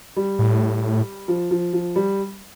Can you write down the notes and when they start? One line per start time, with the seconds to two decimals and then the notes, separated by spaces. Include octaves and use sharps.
0.16 G3
0.39 A2
1.28 F3
1.51 F3
1.73 F3
1.96 G3